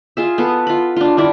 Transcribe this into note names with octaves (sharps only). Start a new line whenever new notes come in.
F4 G#4 E5
B3 A4 B4
F4 B5
D4 F4
G3 D4 E4 D5